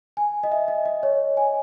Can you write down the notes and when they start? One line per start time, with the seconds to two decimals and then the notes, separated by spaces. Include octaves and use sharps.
0.17 G#5
0.44 D#5
0.52 E5
0.68 D#5
0.86 D#5
1.03 C#5
1.37 G#5